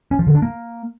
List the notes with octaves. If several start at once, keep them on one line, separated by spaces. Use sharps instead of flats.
C#4
F3
D3
D4
A#3